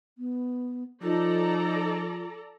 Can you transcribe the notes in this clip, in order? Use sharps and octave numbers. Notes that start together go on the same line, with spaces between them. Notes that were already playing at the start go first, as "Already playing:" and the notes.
B3
F3 D#4 F4 A4 D5 A#5